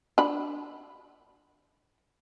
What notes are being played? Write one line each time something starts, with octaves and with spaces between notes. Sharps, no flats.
D4 B5